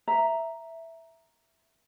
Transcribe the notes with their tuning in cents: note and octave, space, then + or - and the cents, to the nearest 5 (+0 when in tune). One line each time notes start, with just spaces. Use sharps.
E5 +0 A#5 +0